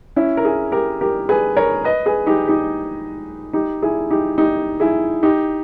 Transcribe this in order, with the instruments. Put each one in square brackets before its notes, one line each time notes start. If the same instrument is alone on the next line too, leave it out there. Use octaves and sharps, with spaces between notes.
[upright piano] C#4 E4
A#4
E4 G#4
G4 A#4
G4 A#4
G#4 B4
A#4 C#5
B4 D#5
G#4 B4
D#4 G4
D#4 G4
D#4 G4
E4 G#4
D#4 G4
D#4 G4
E4 G#4
D#4 G4